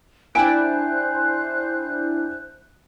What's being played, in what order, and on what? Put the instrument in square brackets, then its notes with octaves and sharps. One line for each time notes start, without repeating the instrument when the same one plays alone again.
[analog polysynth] D4 E4 [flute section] C5 F#6 G6 [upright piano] G5 G#5 D7